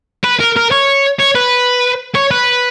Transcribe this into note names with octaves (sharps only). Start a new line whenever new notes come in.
B4
A#4
A#4
C#5
C#5
B4
C#5
B4